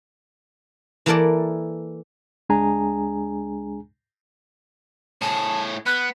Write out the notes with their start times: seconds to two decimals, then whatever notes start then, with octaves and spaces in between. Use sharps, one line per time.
1.06 E3 A#3 E4 A4 A#4 D5
2.49 C#2 G#3 D4 G#4 G#5 A#5
5.22 A2 G#4 A5
5.86 B3 F#6